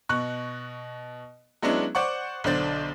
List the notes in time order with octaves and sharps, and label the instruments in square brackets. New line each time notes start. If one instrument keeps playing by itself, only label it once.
[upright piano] B2 C#6 F#6
F#3 G#3 B3 C#4 D4 E4
C5 D5 F#5 C#6
B1 D3 D4 C5 A6